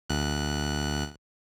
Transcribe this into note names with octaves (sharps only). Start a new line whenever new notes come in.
D2 F#6